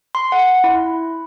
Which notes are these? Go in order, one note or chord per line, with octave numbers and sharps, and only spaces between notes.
C6
F#5
E4